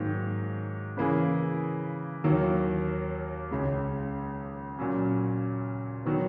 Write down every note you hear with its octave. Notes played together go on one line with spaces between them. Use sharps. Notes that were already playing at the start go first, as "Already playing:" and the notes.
Already playing: G#2 D#3 F#3 A#3
C#3 E3 A#3 E4 G#4
D#2 D#3 F#3 A#3
C#2 C#3 G#3
A#2 F#3 C#4
D#3 F#3 B3